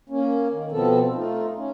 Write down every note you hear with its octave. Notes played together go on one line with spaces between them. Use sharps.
A#3 C#4
D#3
B2 F3 B3 C4 A4
A3 D#4 F4
C#4